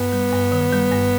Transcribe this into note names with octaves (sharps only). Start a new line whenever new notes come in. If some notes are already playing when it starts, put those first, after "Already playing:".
Already playing: G2 B3
G3
G2
D#3
G3
G2